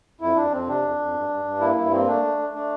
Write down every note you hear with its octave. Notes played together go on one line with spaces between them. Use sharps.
F2 E4
F2 D4
F2 C4
C3 D4
F2
F2
G2
G2
G2
A#3 E4
G2 E4
A#3 C4
A3 D4
A3
A3
A3 D4